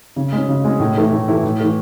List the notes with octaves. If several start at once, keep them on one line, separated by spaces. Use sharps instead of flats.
C#3
G#3 C#4
C#3
G#3 C#4
A2
E3 A3 E4
A2
E3 A3 E4
A2
E3 A3